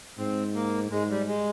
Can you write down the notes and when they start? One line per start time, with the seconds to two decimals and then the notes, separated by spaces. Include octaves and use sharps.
0.18 G#2 C4
0.55 A#3
0.91 G#2 G#3
1.09 G3
1.27 G#3